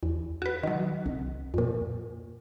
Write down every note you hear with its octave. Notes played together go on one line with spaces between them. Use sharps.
E2
F#4 B4
D#3 F#3
C2
F2 A#2